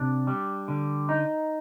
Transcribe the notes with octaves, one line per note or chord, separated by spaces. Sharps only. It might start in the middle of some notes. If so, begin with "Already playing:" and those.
Already playing: C3 D4
G3
D3
D#4